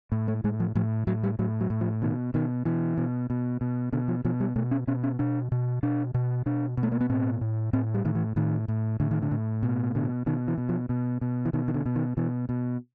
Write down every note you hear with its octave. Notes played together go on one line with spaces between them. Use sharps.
A2
A3
A2 G#3
F3
A2 F3
A2 F#3
G3
A2 F#3
F#3
A2
F3
B2 D#3
B2 D#3
B2 E3
B2
B2
B2
B2 D3
F3
B2 F3
G3
B2 A3
C#4
B2 C#4
C#4
B2 D4
B2
B2 D4
B2
B2 D4
B2
A3
A#3
B3
A2 C4
A2
A2 C4
G3
A2 D#3
E3
A2 D#3
A2
A2 D3
D#3
D3
A2
B2
B2 D3
B2 D#3
E3
B2
F3
B2
B2
E3
B2 D#3
D#3
D3
B2
D#3
B2 E3
B2